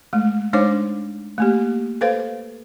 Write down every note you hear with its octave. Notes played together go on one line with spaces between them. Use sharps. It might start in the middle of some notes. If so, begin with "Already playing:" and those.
G#3 A3
G#3 D4 D#4 C5 C#5 D6
A3 A#3 G4
A4 B4 C5 F5